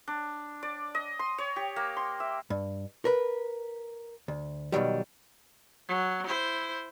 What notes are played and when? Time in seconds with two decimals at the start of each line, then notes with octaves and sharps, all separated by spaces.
0.08 D4
0.63 D5
0.95 D#5
1.19 C6
1.38 C#5
1.56 G4
1.76 A#3
1.97 C6
2.20 E5
2.50 G2
3.05 A#4 B4
4.28 D2
4.72 B2 D#3 F#3 G3
5.88 F#3
6.26 E4 C5